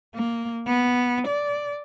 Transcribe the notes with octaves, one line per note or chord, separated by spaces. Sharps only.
A#3
B3
D5